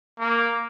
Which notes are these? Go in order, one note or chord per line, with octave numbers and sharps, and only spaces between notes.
A#3